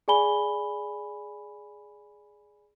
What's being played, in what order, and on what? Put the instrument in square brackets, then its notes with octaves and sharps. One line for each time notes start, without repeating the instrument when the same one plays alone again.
[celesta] G#4 D5 G#5 B5 G7